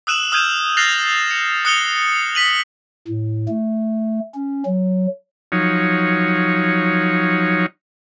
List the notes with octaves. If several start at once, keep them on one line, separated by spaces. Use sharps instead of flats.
D#6 E6 F#6 D#7 E7 F#7
D#6 F6 G6 G#6 D#7 E7
F6 F#6 A6 A#6 C7 F7
C#7
D#6 F#6 C#7 G7
B6 D#7 F#7
A2
A3
C#4
F#3
F3 F#3 D#4 C#5